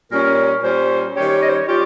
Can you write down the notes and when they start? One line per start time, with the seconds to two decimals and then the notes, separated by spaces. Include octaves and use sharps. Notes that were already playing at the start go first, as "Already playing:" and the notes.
0.11 A#2 G3 C#4 A#4
0.63 A#2 G3 C#4 C5
1.16 D#3 G3 C#4 G4 C#5
1.29 C#5
1.42 D#5
1.49 C5
1.55 C#5
1.67 G3 C#4 F4 G4